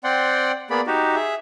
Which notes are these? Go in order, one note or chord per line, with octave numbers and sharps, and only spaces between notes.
C4 D5 F#5 G5 C6
A#3 B3 G#4 D5 B5
D#4 F#4 G4
G#4 E5